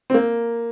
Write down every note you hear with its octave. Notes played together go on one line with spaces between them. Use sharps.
C4
A#3